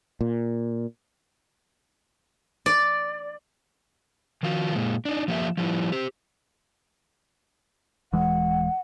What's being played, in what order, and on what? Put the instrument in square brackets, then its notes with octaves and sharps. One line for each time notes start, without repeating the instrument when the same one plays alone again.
[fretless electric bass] A#2
[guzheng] D5
[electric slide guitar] D#3 F3 F4 F#4
A#2 G#3
D4 D#4
F3 A#3 G4 E5
F3 G3 E4
G4 C5
[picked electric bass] D#1 E3 G#3 [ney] F#5